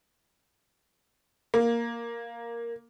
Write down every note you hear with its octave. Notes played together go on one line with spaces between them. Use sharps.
A#3